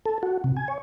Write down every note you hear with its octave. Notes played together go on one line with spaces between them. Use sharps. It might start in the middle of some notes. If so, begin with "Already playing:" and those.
A4
F#4
C3
G#5
C#5